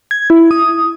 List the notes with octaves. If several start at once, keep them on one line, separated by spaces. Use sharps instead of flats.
G#6
E4
D#6